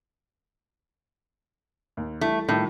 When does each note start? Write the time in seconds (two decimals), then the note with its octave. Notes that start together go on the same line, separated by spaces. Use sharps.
1.97 D#2
2.21 E3 G3 A3
2.49 A2 D#3 F3 G3